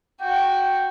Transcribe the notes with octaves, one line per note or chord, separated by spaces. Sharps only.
F#4 G5